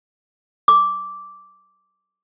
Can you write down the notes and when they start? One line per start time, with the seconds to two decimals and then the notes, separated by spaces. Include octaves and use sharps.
0.68 D6